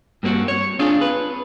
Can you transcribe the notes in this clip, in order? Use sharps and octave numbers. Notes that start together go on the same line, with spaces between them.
G2 A#3 C4 F#4
C#5
C4 D4 F4 G#4
B4